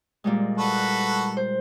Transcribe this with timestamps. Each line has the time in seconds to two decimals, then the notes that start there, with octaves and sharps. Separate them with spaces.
0.24 A#2 G3 G#3
0.58 F#4 A4 B4
1.37 C5